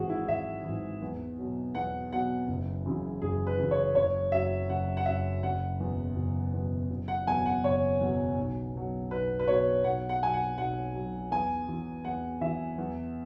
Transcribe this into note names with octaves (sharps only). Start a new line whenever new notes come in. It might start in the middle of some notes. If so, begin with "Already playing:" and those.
Already playing: G#1 G#2 E3 F#4 G#4
E4
G#1 E5
G#2 E3
E2
B2 F#3
E2 F#5
B2 F#3 F#5
F#1
F#2 C#3 E3
F#1 G#4
B4
F#2 C#3 E3
C#5
F#1 C#5
F#2 F#3 E5
F#1 F#5
F#5
F#2 F#3 E5
F#1 F#5
E2 B2
F#1
E2 B2
F#1
F#5
E2 B2 F#3 G#5
F#5
F#1 C#5
E2 B2 F#3
B1
B2 F#3
B1 B4
B4
B2 F#3 C#5
B1 F#5
F#5
B2 F#3 G#5
F#5
B1 F#5
B2 F#3
E2 G#5
E3
E2 F#5
E3 E5
E2